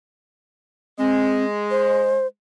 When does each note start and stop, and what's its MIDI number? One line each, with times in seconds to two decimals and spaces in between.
0.98 2.24 56
0.98 1.45 60
1.71 2.27 72